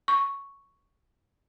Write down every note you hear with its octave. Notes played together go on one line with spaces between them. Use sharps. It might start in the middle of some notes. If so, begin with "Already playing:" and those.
C#6